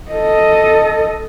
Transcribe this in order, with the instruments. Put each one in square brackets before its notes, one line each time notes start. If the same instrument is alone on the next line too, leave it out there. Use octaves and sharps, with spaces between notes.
[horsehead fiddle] A4 D#5